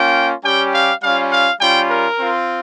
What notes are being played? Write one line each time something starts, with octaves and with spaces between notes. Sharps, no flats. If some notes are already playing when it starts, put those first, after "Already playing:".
Already playing: A#3 C#4 F4 G5
G3 C#4 G4 G5
F5
G3 C#4 F4 F5
F5
G3 C#4 F4 G5
A#4
C4 F4